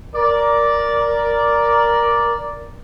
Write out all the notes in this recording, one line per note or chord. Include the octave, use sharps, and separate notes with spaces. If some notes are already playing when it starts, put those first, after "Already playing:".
A#4 D5